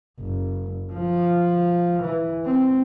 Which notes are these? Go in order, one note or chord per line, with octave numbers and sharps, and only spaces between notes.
F#1
F3
E3
C4